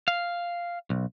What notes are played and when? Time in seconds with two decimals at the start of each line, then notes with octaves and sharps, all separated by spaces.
0.08 F5
0.90 B1